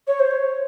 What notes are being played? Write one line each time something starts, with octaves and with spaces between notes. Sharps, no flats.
C#5
C5
C#5